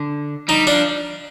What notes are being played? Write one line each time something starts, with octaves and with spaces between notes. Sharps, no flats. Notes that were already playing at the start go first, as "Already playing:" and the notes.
Already playing: D3
G3 D#4
F3 D4